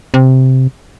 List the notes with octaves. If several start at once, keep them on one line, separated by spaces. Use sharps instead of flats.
C3